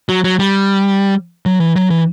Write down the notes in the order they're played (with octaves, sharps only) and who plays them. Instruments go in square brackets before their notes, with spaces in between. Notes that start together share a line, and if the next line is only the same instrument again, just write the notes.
[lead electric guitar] F#3
F#3
G3
F#3
E3
F#3
E3